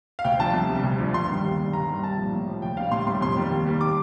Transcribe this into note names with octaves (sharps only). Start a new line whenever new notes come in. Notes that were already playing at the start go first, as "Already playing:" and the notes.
F5
D2 G5
D3 F3 A5
C2
C3
G3
D2
D3 F3
G2 C6
D#3 G3
D#2
D3 G3
G2 A#5
D#3 G3
C2 A5
A#2 F3
A2
F3
D2 G5
D3 G3 F5
A2 C6
G3 C6
F2 C6
D#3 G3
D#2
D#3 G3
D6